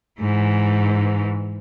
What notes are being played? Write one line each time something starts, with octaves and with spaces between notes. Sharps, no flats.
G#2 E3